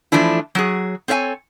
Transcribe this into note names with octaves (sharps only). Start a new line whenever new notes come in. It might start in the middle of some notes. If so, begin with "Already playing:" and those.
E3 F3 A3 D4 E4
F#3 F#4 G#4
C4 A4 C#5 E5 G#5